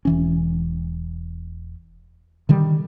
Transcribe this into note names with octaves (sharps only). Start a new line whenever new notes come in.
E1 E3 C#4
D3 D#3 G3